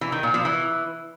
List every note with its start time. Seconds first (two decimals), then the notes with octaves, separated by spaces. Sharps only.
0.01 E3
0.12 D#3
0.23 A#2
0.34 F3
0.45 E3